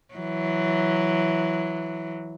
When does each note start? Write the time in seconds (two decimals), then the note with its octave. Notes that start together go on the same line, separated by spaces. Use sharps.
0.15 E3 F#3